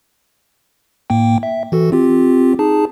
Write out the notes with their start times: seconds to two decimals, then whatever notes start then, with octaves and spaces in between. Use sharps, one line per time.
1.10 A2 A#3 G5
1.43 E5
1.72 E3 F#4 A4
1.92 C4 F4 G4
2.59 D#4 G#4 A5